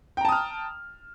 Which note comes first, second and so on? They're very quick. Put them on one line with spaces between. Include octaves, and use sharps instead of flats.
G5 A#5 A5 D#6 F6